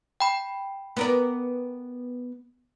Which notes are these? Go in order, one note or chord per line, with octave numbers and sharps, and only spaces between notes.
G5 B5
B3 A#4 D5